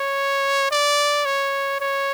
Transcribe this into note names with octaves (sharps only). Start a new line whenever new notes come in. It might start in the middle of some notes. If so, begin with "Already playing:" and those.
Already playing: C#5
D5
C#5
C#5